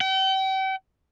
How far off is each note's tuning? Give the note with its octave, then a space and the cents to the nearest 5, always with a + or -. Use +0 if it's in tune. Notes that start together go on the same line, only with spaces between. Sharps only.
G5 -40